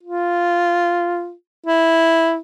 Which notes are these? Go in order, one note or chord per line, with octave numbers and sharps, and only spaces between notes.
F4
E4